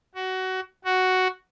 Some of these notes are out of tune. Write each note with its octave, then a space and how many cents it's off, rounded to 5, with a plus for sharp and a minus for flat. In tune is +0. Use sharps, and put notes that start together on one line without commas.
F#4 +20
F#4 +5